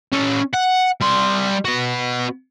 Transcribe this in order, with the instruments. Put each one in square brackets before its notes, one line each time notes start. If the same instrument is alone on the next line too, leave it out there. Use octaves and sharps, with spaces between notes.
[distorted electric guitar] C#4 A4
F#5
G3 C6
B3 F#4